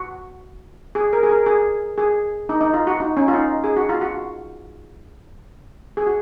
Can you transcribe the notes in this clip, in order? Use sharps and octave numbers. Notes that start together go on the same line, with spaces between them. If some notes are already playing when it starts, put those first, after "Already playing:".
Already playing: F#4
G#4
A#4
G#4
A#4
G#4
G#4
D#4
D#4
F4
F#4
D#4
C#4
F4
D#4
G#4
F#4
F4
F#4
G#4
F#4